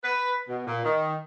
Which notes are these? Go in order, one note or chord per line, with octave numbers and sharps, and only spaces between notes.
B4
B2
A#2
D#3